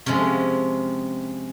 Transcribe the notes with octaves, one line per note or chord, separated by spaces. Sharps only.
C3 F3 G#3 C#4